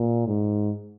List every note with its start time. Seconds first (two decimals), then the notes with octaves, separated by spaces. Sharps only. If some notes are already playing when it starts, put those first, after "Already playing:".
Already playing: A#2
0.27 G#2